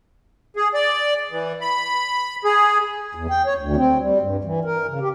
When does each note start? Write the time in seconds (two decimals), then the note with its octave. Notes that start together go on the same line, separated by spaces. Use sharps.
0.56 G#4
0.74 D5
1.31 E3
1.61 B5
2.44 G#4
3.15 E2
3.30 G5
3.46 C#5
3.58 D2
3.76 C4
3.99 G3
4.21 G2
4.44 E3
4.65 A#4
4.88 C#3
5.00 G4